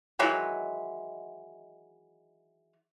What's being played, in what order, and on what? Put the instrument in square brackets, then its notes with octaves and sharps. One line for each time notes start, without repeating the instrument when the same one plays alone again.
[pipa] D#3 E3 F#3 G#3